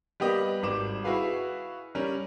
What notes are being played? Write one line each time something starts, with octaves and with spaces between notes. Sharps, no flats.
G3 A#3 B3 G4 B4 D#5
G#1 G3 D6 E7
E4 F#4 G#4 B4 F5
G3 C#4 A#4